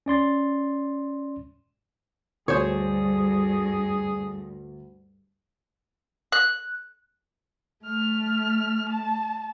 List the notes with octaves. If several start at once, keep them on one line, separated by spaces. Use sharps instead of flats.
C#4 D5 C6 A6
D2 G2 G#4 C5 C#5
F#6
A3 F6
A5